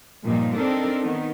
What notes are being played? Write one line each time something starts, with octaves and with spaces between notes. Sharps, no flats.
G2 A#2 F3 D#4
C4 D4 D#4 A4 A#4
D#3 B3 D#4